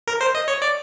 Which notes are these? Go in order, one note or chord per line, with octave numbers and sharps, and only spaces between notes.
A#4
C5
D#5
C#5
D5